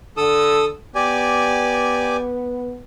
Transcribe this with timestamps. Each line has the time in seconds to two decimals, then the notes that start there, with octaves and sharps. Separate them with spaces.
0.17 D3 A4 D#6 E6
0.95 B3 G4 D5 G#5